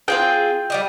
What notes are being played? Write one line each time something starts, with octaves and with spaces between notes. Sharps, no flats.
C4 F4 G#4 G5
G3 D5 D#5